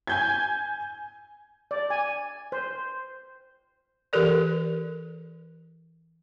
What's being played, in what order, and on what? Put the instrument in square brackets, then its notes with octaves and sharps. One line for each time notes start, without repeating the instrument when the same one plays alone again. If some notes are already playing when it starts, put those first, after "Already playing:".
[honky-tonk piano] G#5 G6 G#6
[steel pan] D5
G#5
C5
[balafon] E3 G4 A4 A#4 D5